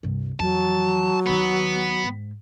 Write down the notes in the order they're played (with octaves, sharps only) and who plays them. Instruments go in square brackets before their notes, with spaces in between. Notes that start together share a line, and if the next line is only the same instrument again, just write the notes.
[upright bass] C2 G2
[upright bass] F2 E3 [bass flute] F#3 [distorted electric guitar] A5
[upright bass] D#2 D#3 [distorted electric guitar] B3
[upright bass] G#2